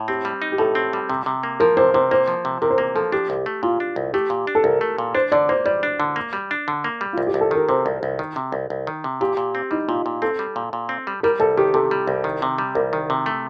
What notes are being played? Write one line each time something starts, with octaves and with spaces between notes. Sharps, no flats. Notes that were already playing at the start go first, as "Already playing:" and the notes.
Already playing: A2
C4 G4
G3
D#4
G4
A2 A4
C4
G3
C3
C3
A#3
F3 A#4
C3 C5
C3 C5
A#3 C5
F3
C3
C3 A#4
C5
A#3 A#4
F3 A4
D4 G4
C2
A3
A#2 F4
D4
C2
A3 G4
A#2
D4
A4
C2 A#4
A3
A#2
D4 C5
D3 D5
A#3 C5
G3 D5
D4
D3
A#3
G3
D4
D3
A#3
G3
C2 F4
G4
C2
A4
D#3 A#4
C3 C5
C2
C2
D#3
C3
C2
C2
D#3
C3
A#2 G4
A#2
C4
G3 D#4
A#2 F4
A#2
C4 A4
G3
A#2
A#2
C4
G3
G3 A#4
C2 A4
D#3 G4
C3 A4
G3
C2
D#3
C3
G3
C2 A#4
D#3
C3
A3